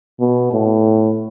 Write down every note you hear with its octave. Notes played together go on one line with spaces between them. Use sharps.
B2
A2